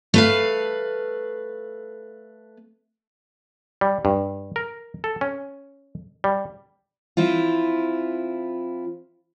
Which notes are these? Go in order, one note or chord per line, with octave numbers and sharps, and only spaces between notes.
A3 B4 F5
G3
G2
A#4
A4
C#4
G3
F3 C4 E4 F4